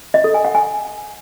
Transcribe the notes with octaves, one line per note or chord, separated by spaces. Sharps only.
D#5
A4
G#5
F#5
G#5